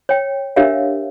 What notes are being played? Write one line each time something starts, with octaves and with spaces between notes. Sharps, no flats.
C#5 G5
D4 G4 A#4 C#5 E5 F5